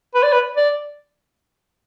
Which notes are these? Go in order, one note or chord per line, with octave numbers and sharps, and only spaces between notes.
B4
D5
B4
D5